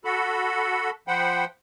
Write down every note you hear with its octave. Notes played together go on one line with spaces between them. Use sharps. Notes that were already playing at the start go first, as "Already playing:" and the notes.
F#4 A4 B5
F3 C5 F#5 G5 B5